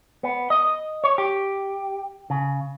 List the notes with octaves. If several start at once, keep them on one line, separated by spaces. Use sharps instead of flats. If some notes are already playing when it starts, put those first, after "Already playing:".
B3
D#5
C#5
G4
C#3